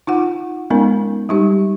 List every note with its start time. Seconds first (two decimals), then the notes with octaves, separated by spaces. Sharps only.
0.07 D#4 F4 F#5
0.70 G#3 B3 C#4 D#4 A#4
1.29 G3 D#4 G4